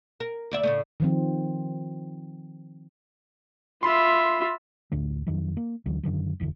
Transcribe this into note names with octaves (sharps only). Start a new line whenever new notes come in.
A#4
D2 D5 E5
A2 C#3 A3
D#3 F3 C4
F4 E5 B5 C6
A1 D2 D3 A3
F2 D#3 F#3
A#3
D2 D3 E3 F#3
F#2 D3 D#3 F#3
F#1 E2 G#2 D3